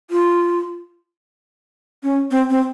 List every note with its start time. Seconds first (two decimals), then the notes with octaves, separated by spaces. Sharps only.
0.11 F4
2.03 C#4
2.31 C4
2.50 C4